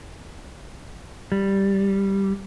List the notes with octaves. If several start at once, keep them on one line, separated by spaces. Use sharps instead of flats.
G3